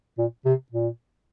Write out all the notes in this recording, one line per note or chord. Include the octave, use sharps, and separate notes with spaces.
A#2
C3
A#2